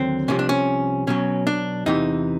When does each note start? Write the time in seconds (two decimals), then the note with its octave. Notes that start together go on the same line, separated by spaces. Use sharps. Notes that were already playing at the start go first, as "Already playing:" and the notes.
Already playing: D#2 D3 F#3 C4
0.28 C2 C3 F3 C#4
0.39 D4
0.49 C#4
1.07 B1 B2 F#3 C#4
1.47 D4
1.86 E2 C3 E3 D#4